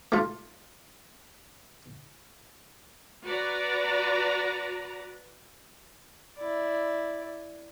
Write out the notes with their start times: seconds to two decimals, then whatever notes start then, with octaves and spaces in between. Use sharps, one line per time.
0.12 A3 F4
3.25 F#4 B4 D5 A#5
6.37 E4 D5